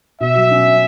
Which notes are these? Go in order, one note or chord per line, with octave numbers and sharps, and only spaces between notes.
B2 E5
F#3
C#4